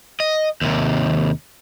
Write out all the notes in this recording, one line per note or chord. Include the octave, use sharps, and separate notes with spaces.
D#5
D#2 C3